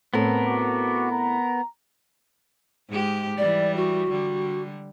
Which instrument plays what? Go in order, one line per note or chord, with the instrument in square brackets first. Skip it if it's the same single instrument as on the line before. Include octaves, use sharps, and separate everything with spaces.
[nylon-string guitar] A2 C4 A4 [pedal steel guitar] B3 A#4
[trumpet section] F#4 D6
A#5
[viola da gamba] G#2 G#3 G4
[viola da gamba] E3 G3 [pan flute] D5
[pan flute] F#4
[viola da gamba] D3 G3